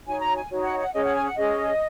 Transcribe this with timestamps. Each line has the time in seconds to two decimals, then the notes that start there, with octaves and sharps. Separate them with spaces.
0.06 D#4 F#4 C#5 G#5
0.21 A#5
0.35 G#5
0.50 D#4 F#4 C#5
0.64 F#5
0.79 F#5
0.93 C#4 G#4 C#5 D#5
1.04 F#5
1.15 G#5
1.25 F#5
1.36 C#4 G#4 C#5 D#5